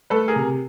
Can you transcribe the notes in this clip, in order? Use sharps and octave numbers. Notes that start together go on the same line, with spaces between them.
A3 A4 B4
G#4 A#4
C3